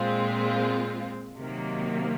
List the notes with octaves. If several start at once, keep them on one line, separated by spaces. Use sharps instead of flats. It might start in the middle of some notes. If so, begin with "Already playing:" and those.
Already playing: A#2 G#3 C4 F4
C3 D#3 F#3 A#3